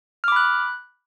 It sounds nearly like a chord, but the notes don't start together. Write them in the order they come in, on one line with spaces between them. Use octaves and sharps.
F6 D6 B5 F#6